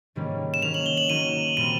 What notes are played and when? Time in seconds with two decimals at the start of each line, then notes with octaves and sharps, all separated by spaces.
0.15 G#2 D#3 G3 A#3 C#4
0.54 E7
0.62 D#3 F#3 A#3 C#4 F7
0.74 F#7
0.86 G7
0.98 F#7
1.09 D#3 F#3 A#3 C#4 D#7
1.57 A#2 G3 C4 D#7